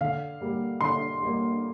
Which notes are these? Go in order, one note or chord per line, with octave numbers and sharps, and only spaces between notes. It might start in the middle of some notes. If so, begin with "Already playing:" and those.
D3 F5
G3 A#3
D3 C6
G3 A#3